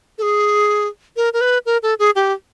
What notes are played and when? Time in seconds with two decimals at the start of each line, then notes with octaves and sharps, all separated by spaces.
0.18 A4
0.22 G#4
1.16 A#4
1.33 A#4
1.41 B4
1.66 A#4
1.83 A4
1.99 G#4
2.16 G4